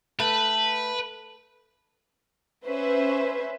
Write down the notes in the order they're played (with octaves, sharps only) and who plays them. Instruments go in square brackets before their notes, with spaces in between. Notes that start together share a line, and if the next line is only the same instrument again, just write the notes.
[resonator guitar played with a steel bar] A3 [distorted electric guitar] B4
[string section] C#4 B4 C5 E5